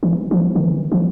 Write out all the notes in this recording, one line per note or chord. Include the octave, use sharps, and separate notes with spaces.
E3
F3
D3
E3
F3